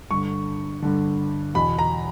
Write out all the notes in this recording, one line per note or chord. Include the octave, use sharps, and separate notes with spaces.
G2 D3 C#6
G2 D3
E2 B2 B5
A#5